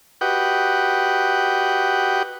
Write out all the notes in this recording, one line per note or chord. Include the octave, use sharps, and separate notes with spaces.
F#4 G4 B4 D#5 F#5 G5